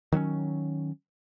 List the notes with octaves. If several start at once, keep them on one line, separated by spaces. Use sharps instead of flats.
D#3 F#3 B3 C#4